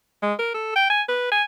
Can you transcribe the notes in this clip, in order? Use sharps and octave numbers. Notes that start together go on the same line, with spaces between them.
G#3
A#4
A4
G5
G#5
B4
G#5